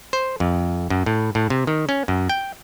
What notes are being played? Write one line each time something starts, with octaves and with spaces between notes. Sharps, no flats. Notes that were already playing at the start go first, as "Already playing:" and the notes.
C5
F2
F#2
A2
A2
C3
D#3
C#4
F#2
G5